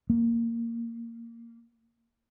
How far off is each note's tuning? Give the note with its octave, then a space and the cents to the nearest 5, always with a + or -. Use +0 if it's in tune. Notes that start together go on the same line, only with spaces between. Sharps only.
A#3 -10